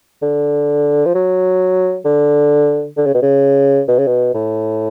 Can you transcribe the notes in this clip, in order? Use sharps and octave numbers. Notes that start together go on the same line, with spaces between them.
D3
F3
F#3
D3
D3
C#3
B2
C#3
B2
C#3
B2
A2